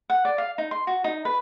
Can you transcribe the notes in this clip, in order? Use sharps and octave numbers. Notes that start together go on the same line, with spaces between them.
F#5
D5
F5
D#4
C6
F#4
D#4
B4